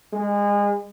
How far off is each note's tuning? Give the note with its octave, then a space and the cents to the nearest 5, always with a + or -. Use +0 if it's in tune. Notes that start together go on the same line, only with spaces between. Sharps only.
G#3 -30